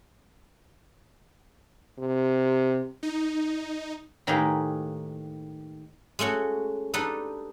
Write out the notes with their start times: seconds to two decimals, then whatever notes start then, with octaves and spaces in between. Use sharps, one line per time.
1.99 C3
3.03 D#4
4.27 A2 D#3 A#3 G4 G#4 B4
6.19 G#3 A3 C#4 F#4
6.94 D4 D#4 G4 A4 B4